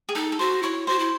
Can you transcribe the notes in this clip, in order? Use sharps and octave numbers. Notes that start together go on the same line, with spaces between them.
G#4
D#4 A4
A4
F#4 C5
E4 C#5
F#4 C5
E4